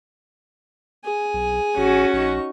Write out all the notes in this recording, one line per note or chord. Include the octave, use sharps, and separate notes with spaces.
G#4 G#5
B1
A1 C#4 F#4
A#1 D#4 C#6